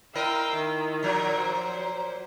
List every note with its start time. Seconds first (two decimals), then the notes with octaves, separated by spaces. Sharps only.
0.15 E4 A#4 D#5 F5 G5 E6
0.54 D#3
1.03 A#2 F3 F#3
1.34 C5